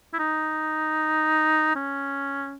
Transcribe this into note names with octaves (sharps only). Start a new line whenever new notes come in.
E4
D#4
C#4